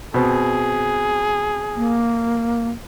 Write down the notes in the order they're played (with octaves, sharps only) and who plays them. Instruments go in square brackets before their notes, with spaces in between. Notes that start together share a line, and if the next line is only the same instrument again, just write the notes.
[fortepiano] B2 C4 [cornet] G#4
[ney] A#3